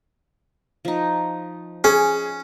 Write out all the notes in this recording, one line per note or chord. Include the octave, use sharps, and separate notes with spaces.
F3 D#4
C#4 G#4